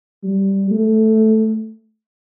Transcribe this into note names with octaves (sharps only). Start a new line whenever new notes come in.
G3
A3